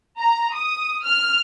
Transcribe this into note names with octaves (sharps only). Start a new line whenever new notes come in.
A#5
D#6
F6